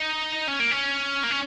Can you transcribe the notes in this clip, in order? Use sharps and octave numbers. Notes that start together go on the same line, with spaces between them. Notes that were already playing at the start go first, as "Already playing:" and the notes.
Already playing: D#4
C#4
A#3
C#4
A#3
C#4